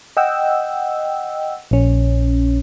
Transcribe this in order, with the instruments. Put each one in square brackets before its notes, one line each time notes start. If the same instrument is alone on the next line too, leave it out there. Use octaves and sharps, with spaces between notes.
[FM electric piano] D#5 F#5 G5 E6
A#1 C#4